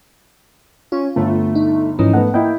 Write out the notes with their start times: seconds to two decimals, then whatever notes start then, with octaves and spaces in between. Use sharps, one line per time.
0.92 C#4 F4
1.16 G1 A3
1.55 D#4
1.99 G#2 E3 F3 C#4 D#4
2.13 A3 B3 F#5
2.34 A#3 E4 D#5 G5